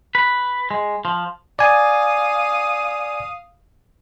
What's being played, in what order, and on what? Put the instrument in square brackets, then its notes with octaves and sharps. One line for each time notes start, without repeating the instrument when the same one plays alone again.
[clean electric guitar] B4
G#3
F3
[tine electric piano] D5 G#5 [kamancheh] F5 D#6